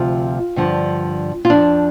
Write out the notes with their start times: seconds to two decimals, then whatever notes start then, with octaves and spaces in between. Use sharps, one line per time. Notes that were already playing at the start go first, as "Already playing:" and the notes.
Already playing: D2 C3 F3 F4
0.56 G2 D3 F3
1.45 F4
1.50 F2 F3 D4